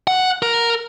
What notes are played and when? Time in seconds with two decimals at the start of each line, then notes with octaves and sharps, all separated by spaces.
0.07 F#5
0.42 A#4